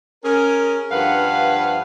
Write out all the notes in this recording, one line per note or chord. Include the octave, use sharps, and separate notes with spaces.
C#4 G#4 A#4
G2 F3 B4 F5 F#5